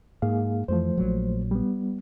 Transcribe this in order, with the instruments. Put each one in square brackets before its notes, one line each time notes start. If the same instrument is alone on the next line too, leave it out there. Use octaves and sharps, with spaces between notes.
[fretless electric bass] G#2 [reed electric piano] A#3 G#4 F5
[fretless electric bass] F2 E3 [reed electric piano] F3 A3 C5
[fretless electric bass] A#1 A#2 F#3
[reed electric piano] G3 B3